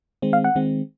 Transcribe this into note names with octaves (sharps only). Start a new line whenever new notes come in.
D#3 G#3 C4
F5
F#5
D#3 G#3 C4